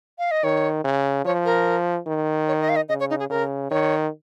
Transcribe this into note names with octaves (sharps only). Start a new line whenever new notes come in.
F5
D#5
D#3 C#5
C#3
F3 C#5
A#4
D#3
C#5
D#5
F5
D#5
C#3 D#5
C#5
D#4
G#4
C#3 A#4
D#3 C#5